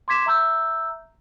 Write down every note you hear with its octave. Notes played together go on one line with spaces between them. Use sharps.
C6 D6 G#6 B6 E7
E5 A#5 E6 G6